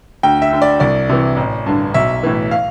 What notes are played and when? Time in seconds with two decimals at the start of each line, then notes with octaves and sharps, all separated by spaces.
0.23 D2 G5
0.42 E5
0.53 D3
0.62 D5
0.80 C2 D5
1.09 C3 E3
1.37 A1
1.66 G2 D3
1.94 B1 E5
2.23 A2 E3
2.51 F5